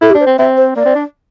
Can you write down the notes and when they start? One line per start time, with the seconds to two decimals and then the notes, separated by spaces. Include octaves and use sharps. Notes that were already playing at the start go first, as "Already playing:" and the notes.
0.02 E4 A4
0.10 G4
0.15 D4
0.20 C5
0.26 C4
0.38 C4 E5
0.57 C5
0.76 A#3 D5
0.85 C4
0.95 D4